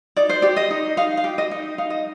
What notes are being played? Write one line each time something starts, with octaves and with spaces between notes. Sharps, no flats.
D#4 D5
C5
G4 D5
D#5
D#4
D#4 F5
F5
G4
D#5
D#4
D#4 F5
D#5